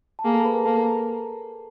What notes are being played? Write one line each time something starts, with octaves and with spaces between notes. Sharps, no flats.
A5
A#3 G#4 G#5
A4 A5
A#5
B4 B5
A#4 A#5
A#3 A4 A5
A#4 A#5